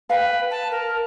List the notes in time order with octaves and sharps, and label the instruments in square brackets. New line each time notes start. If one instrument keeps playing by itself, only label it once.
[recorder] B4 [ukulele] F5 G5
[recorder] A5
A#4